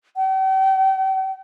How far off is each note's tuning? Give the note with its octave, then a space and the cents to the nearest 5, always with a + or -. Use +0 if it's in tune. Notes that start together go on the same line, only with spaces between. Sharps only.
G5 -40